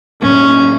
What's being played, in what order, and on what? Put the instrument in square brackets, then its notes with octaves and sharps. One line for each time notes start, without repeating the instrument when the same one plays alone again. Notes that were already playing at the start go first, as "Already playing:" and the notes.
[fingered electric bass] A2 F#3 A#3 D4 [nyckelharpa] C#4